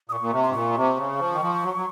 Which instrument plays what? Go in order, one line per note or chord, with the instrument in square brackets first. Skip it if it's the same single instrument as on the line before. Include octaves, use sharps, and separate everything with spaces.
[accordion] A#2 [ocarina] D#6
[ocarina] C#6
[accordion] A#2
C3
[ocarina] C6
[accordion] G#2
[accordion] A#2 [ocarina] C#6
[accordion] C3
C#3
F3
D#3
F3
F#3
F#3